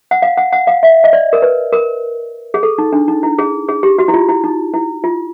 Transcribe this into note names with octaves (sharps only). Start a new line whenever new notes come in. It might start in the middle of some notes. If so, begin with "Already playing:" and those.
F#5
F5
F#5
F#5
F5
E5
D#5
D5
A#4
B4
A#4
G#4
A4
D#4
D4
D#4
E4
G#4
G#4
G4
F#4
E4
F4
E4
D#4
E4
F4